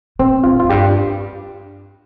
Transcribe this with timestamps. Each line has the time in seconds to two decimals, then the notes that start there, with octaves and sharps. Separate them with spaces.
0.19 A#2 C4
0.44 A#2 F4
0.60 F2 F4
0.69 G2 G4